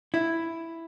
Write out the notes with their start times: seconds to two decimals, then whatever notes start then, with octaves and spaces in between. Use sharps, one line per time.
0.14 E4